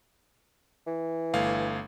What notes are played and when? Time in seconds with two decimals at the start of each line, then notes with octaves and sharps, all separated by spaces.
0.87 E3
1.34 G1 A3 F5